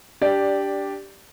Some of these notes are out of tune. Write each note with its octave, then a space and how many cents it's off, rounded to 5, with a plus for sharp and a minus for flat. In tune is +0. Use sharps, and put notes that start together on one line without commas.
D4 -10 G4 +0 D5 +0